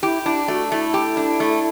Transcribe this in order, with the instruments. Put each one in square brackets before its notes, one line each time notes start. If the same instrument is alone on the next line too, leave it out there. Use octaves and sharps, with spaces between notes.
[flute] E4 [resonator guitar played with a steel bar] G4
[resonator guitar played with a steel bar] D4 [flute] E4
[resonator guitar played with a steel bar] A3 [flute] F#4
[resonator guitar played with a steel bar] A3 [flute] E4
[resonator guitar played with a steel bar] G4
D4
A3